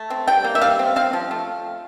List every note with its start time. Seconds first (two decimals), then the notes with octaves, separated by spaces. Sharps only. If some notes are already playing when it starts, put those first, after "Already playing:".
Already playing: A3
0.10 C4
0.28 G3 G5
0.44 A#3
0.55 E5
0.61 G3 F5
0.79 C4
0.96 C4 F5
1.13 F3
1.31 A3